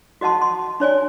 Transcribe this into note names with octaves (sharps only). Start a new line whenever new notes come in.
F#4 D#5 F#5 A5 C6
C6
D4 C#5 D5 G#5